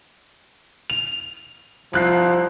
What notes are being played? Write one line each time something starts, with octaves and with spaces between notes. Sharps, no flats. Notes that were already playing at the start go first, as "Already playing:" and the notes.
F7
C2 F3 F#6 C7